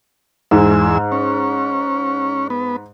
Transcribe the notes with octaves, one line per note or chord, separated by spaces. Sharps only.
E2 G#2 G#3 E6
C#4
B3